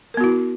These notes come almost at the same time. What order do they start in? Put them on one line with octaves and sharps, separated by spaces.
A#4 B3 F#4 E4